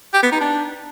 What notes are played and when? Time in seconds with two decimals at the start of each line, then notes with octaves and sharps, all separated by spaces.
0.14 G4
0.23 B3
0.32 D#4
0.41 D4